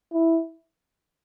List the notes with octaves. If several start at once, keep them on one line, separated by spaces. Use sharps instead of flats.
E4